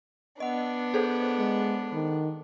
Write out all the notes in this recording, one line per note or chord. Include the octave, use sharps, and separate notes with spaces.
B3 D4 D#5 F#5
G#4 A4 C5
G#3
D#3